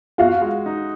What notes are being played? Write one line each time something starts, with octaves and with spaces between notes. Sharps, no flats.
F4 F#4 F5
G#3
D#4